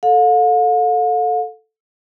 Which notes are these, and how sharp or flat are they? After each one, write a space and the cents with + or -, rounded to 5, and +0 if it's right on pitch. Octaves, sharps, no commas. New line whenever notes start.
A4 +0 F5 +45